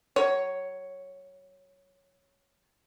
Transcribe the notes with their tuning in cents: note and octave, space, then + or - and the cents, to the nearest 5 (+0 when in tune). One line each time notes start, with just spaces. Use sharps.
F#3 +30 C#5 +0